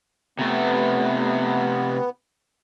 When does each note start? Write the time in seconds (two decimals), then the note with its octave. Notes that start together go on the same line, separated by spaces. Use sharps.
0.39 C3 A3 B3